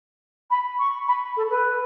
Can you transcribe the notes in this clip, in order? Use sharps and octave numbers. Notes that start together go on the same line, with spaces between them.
B5
C#6
B5
A4
B4